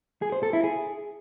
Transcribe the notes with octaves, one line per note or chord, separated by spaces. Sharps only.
G#4
C5
A4
E4
G#4